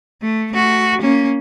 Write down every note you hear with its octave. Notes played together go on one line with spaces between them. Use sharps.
A3
A3 F#4
A#3 C#4